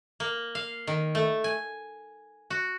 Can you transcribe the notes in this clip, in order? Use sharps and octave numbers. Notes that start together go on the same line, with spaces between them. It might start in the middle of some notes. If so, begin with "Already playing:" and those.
A#3
F5
D#3
A3
G#5
F#4